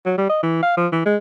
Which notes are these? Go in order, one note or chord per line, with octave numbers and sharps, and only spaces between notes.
F#3
G3
D#5
E3
F5
F3
E3
G#3